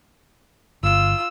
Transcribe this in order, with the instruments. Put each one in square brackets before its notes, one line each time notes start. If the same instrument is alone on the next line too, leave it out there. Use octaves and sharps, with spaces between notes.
[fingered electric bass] G1 [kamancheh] F4 E6